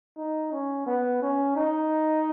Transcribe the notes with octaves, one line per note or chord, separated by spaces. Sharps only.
D#4
C#4
B3
C#4
D#4